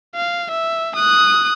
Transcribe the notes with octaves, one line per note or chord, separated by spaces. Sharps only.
F5
E5
D#6 F#6